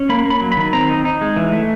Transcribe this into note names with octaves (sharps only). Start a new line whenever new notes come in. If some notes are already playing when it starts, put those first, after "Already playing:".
Already playing: C#4
A#3 B5
A#3 B5
F#3
B5
D#3
C4 A#5
D#4
D#4
G#3
E3
A3